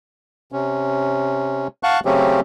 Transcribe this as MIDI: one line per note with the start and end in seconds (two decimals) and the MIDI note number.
0.52 1.68 48
0.52 1.68 61
1.83 2.00 77
1.83 2.00 78
1.83 2.00 81
1.83 2.00 85
1.83 2.00 90
2.05 2.40 49
2.05 2.40 54
2.05 2.40 57
2.05 2.40 60
2.05 2.40 61
2.05 2.40 67